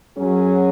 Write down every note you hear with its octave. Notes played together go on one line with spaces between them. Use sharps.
F#2 F#3 C#4 G#4